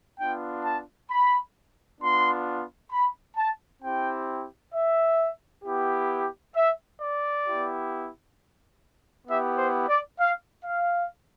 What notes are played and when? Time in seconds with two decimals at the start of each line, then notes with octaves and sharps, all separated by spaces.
0.19 B3 D4 F4 G5
0.64 A5
1.10 B5
2.00 B3 D4 F4 C6
2.91 B5
3.37 A5
3.83 C4 E4 G4 G5
4.74 E5
5.64 B3 E4 G4
6.55 E5
7.01 D5
7.46 B3 E4 G4
9.28 B3 E4 G4 E5
9.58 C5
9.88 D5
10.19 F5
10.64 F5